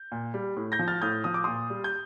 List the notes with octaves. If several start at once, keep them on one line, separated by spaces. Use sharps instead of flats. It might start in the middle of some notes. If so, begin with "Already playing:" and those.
Already playing: G6
A#2
G3
A2
G6 A#6
F3
F6 A6
A2 D#6 G6
F3 D#6
D6
A#2 C6 D#6
G3
G6